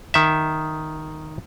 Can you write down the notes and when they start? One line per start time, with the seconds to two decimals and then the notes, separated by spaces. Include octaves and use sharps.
0.14 D#3 E5